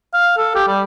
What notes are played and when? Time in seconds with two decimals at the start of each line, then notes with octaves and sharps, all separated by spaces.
0.14 F5
0.37 A4
0.55 G4
0.68 G3